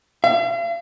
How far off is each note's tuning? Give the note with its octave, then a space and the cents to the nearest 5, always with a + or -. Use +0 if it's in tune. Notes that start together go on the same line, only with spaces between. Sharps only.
F5 -45